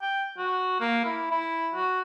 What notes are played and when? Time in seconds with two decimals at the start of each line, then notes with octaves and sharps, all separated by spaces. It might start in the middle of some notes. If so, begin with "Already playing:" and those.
0.02 G5
0.38 F#4
0.80 A#3
1.05 E4
1.31 E4
1.75 F#4